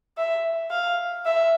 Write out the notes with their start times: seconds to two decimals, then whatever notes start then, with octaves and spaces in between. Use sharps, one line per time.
0.18 E5
0.71 F5
1.26 E5